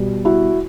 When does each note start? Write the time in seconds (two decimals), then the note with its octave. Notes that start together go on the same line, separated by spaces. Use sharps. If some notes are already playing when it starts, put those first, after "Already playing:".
Already playing: B2 G3 B3
0.25 E4 F#4